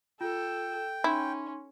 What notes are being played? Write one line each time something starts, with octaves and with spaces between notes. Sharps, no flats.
F4 A4 G5
C#4 D#4 E4 C6